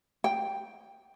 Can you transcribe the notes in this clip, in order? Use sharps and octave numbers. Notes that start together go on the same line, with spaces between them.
G5